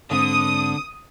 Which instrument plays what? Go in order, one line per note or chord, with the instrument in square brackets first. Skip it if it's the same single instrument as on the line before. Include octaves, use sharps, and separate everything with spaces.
[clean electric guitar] G#2 C4 [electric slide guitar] D3 [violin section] D#6